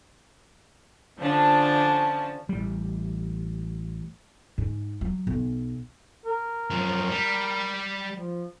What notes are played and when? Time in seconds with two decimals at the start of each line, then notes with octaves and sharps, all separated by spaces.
1.20 D3 F3 C#4 D4 A5
2.49 A1 G3
4.58 G#2
5.01 F#3
5.27 B1
6.25 A#4
6.70 F#2 F3
7.10 G3
8.13 F3